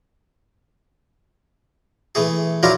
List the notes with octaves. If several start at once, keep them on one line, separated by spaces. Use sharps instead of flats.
E3 A3 G#4
F3 F#3 D4 E4 F4 A#4